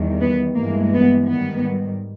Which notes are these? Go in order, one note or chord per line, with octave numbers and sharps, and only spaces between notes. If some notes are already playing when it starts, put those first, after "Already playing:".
Already playing: E2 D#3 G3
B3
G2 E3 G#3 A#3
B3
G#2 D#3 G3 B3